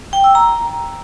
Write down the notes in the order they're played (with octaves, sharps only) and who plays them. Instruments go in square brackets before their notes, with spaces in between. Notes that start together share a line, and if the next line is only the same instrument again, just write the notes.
[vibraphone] G5
E6
A#5